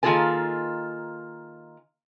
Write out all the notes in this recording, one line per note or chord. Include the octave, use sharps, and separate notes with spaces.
D#3 A#3 F4 G#4 A4 G#5